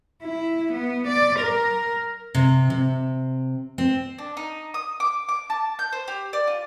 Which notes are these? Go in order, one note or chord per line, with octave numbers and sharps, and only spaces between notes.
E4
B3
D5
A#4
C3
C3
C4
D4
D#4
D#6
D6
D6
A5
G6
C5
G4
D5
F4